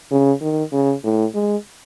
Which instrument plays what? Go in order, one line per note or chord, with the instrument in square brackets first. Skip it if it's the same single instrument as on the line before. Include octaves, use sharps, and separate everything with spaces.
[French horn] C#3
D#3
C#3
A2
G#3